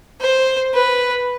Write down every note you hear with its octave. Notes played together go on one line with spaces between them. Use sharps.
C5
B4